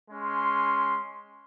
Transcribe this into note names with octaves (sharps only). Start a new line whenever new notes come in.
G#3 C#4 C6